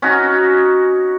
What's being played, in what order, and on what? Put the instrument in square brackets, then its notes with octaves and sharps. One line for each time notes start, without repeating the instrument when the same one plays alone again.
[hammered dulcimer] C#4 D#4 F#4